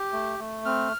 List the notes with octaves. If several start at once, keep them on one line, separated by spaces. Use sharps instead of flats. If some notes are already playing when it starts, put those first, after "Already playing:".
Already playing: G4
A3
A3
C4 F6